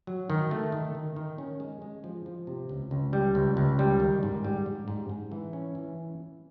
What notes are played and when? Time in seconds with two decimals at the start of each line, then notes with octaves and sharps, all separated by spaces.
0.07 F#3
0.30 D#3
0.51 A3
0.72 D#3
0.95 D#3
1.16 D#3
1.38 C#4
1.60 G#3
1.82 G#3
2.04 F3
2.26 F3
2.47 C3
2.69 C#2
2.91 C#2
3.13 G3
3.35 C#2
3.57 C#2
3.79 G3
4.00 D#3
4.23 G#2
4.44 G3
4.66 G#2
4.88 G#2
5.10 G#2
5.32 E3
5.53 C#4
5.75 E3